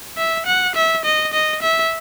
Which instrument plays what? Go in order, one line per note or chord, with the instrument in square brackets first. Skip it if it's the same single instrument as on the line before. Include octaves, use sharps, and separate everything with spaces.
[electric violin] E5
F#5
E5
D#5
D#5
E5